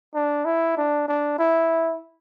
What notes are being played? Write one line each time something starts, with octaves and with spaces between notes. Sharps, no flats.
D4
E4
D4
D4
E4